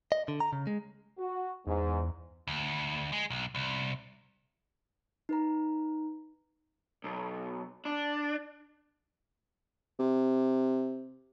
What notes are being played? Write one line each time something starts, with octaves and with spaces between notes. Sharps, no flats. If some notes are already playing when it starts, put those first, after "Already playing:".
D#5
D3
A#5
C#3
G#3
F#4
E2 G#2
D2
G#3
B1
C2
D#4 B4 A#5
B1
D4
C3